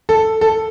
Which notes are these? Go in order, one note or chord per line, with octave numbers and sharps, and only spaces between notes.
A4
A4